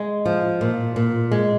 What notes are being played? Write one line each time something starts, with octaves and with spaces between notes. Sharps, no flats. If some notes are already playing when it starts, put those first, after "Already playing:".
Already playing: G#3
F3
A#2
A#2
G#3